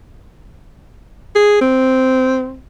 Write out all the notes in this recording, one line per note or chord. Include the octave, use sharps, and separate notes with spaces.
G#4
C4